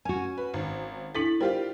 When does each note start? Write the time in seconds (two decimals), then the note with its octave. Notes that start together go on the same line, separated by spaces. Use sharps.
0.05 C#4 F#4 G#5
0.38 B4
0.54 G#1
1.15 D4 E4 A4 A6 B6 F#7
1.41 G3 F4 G4 A#4 C5 G5